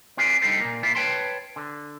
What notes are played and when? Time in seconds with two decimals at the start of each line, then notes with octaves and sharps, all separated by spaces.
0.17 C4 F4 G#4 B4 C5 D5
0.42 G3 D4 D#4 G4 A4 C5
0.60 A#2 A#3
0.83 A#3 E4 F4
0.95 B4 C#5 G5 A5 C6
1.56 D3